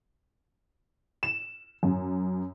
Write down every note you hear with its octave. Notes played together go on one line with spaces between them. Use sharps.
E7
F#2